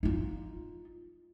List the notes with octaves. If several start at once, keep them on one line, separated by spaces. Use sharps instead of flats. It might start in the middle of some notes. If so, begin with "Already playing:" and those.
D#4 F4